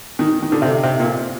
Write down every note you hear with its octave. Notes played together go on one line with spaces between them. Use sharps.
D#3
D#3
D3
C3
C3
A#2